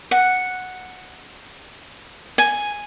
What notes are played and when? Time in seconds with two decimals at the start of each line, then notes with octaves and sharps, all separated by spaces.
0.11 F#5
2.38 G#5